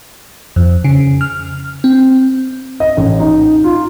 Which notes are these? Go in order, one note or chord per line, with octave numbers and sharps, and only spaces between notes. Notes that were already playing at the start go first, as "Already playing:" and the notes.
F2
C#3
F6
C4
D#5
A1
D#4
F4